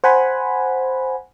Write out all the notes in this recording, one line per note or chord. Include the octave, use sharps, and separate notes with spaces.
C5 F#5 G#5 B5